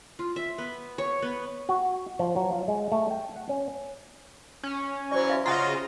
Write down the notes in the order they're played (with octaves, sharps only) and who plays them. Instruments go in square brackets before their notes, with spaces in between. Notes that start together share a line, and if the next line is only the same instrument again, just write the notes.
[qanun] F4
E5
B3
C#5
B3
[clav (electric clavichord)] F#4
F3
F#3
F4
G#3
A3
G5
F#5
C#4
[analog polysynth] C#4
[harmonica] E3 F#3 C#6 [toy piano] C5 D5
[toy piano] F#4 E5 F5
[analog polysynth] C#3 F4 [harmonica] F#4 D#5 C6 [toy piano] A#5